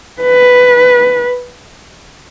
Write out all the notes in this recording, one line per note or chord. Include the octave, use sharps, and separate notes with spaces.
B4